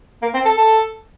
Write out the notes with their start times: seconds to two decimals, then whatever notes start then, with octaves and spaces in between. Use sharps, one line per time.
0.22 A#3
0.34 C4
0.45 A4
0.57 A4